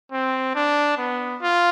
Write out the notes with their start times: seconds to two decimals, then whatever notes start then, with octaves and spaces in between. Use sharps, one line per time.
0.12 C4
0.55 D4
0.97 B3
1.41 F4